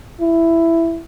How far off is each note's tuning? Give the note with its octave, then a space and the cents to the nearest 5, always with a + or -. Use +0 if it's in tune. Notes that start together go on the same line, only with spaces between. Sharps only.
E4 +10